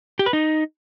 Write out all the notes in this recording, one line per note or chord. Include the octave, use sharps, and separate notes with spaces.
G4
B4
D#4